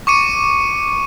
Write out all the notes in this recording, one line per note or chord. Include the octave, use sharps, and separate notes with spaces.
C#6 D6 C#7 D#7